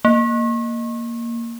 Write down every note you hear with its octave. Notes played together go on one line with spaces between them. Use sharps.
A#3